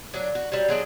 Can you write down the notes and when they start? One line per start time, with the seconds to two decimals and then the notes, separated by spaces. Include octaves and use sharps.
0.14 F#3 D4
0.35 F#4
0.52 F#3 G3
0.68 F#3 G#3 D4 D#4